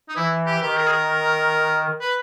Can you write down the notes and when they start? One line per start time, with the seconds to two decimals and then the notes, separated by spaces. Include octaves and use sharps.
0.09 D#4
0.16 E3 E4
0.46 G4
0.62 D#3 G4
0.77 A#4
0.87 G#4
0.92 A#4
2.01 B4